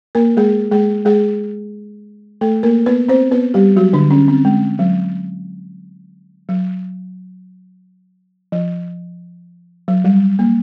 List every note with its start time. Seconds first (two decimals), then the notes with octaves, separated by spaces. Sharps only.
0.15 A#3 A#4
0.37 G#3 G#4
0.72 G#3 G#4
1.05 G#3 G#4
2.41 A3 A4
2.63 A#3 A#4
2.86 B3 B4
3.09 C4 C5
3.31 B3 B4
3.54 G3 G4
3.76 F#3 F#4
3.93 D3 D4
4.10 C#4
4.28 C4
4.45 G#3
4.79 F#3
6.49 F#3
8.52 F3
9.88 F#3
10.05 G3
10.39 A#3